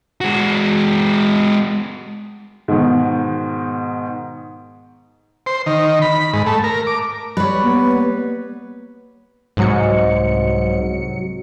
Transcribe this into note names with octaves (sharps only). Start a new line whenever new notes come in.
G#3 F#4
G#2 B2 D#3
C5
D#3
B5
G#2
A3
A#4
D6
G3 B4 C#5
A#3 B3
C2 G#2 F#3 C#7